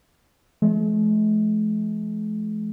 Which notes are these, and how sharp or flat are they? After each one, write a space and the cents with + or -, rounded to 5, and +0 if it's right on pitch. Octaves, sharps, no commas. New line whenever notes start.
F3 -45 G#3 +45